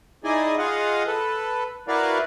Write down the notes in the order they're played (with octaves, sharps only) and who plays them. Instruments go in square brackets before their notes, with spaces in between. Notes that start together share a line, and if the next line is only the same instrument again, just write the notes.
[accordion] D#4 E4 G#4 D5 D#5 G#5
F4 G#4 D#5 F5 F#5
A4 B4
E4 F#4 A#4 B4 D5 F5